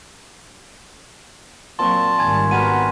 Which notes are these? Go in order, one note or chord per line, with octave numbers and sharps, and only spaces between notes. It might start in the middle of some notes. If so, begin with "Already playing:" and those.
A#2 F#3 A#3 C4 A5 C6 C#6
G#1 D#3 G3 G#5 G#6
B3 F#4 A#4 A5 D#7